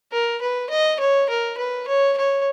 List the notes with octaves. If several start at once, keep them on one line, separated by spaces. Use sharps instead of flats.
A#4
B4
D#5
C#5
A#4
B4
C#5
C#5